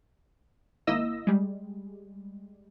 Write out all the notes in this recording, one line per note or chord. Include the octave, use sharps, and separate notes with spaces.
G#1 A#3 E4 D#5 E6 A#6
G3 G#3